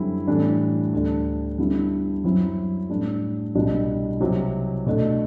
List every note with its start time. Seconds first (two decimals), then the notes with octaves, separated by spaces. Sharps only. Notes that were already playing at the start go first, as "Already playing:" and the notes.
Already playing: F#2 D3 G3 C4 E4
0.28 A2 E3 G3 D4
0.93 D2 D3 G3 D4
1.58 G2 D3 G3 B3 E4
2.24 F#2 F#3 C4 E4
2.90 A2 G3 D4
3.55 C2 B2 G3 D4
4.21 C2 C3 F#3
4.86 B2 A3 D4